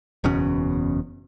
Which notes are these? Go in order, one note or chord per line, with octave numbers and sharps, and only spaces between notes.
F#1 E2 B2 C#4